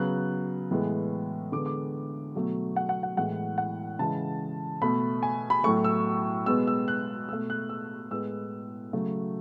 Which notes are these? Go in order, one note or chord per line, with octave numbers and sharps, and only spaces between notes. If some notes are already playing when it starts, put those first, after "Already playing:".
Already playing: C#3 F#3 B3 F#6
A2 E3 G#3 B3
D3 G#3 B3 D6
D6
B2 F#3 A3
F#5
F#5
F#5
A2 E3 G#3 F#5
F#5
C#3 E3 G#3 A5
B2 A3 B5
G#5
B5
A2 F#3 A3 C#6
E6
B2 G#3 B3 E6
E6
F#6
B2 A3 E6
F#6
E6
A2 G#3 B3 E6
C#3 F#3 A3